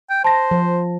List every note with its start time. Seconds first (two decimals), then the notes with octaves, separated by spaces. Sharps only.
0.10 G5
0.24 C5 A5 A#6
0.51 F3